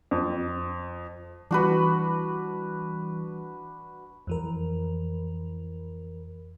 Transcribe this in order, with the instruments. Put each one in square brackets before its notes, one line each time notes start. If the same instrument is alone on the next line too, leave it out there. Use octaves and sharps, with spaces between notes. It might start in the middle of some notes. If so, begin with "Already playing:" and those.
[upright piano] F2
[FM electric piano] E3 G3 [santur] D4 F#4 B4
[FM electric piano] F2 E3 A#4